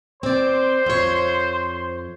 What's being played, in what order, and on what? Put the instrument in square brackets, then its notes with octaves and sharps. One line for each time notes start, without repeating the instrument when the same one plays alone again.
[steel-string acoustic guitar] C4 D5 [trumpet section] C5 C6
[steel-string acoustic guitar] F2 C#5